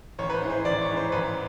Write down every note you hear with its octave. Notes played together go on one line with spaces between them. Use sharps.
A1 C#5
B4
C5
G#2 E3
C5
A1 D5
C#5
G#2 E3
C5
A1 B4